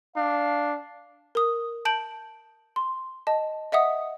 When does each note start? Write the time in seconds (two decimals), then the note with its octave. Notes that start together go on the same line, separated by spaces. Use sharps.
0.16 D4 F5
1.35 A#4 D#6
1.85 A5 G6 D7 F#7
2.76 C6
3.27 D#5 A5
3.72 D#5 E5 F#5 D#6